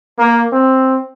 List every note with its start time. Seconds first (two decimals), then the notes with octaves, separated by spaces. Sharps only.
0.19 A#3
0.52 C4